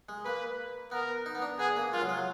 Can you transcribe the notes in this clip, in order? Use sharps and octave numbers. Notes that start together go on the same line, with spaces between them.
G#3
A#3 B4
B3 A#4
D#4
B3
D4
B3 G#4
A#3
G#3 F4
F#3
G#3
F#3